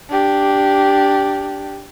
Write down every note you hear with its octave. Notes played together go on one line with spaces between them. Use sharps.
D4 G4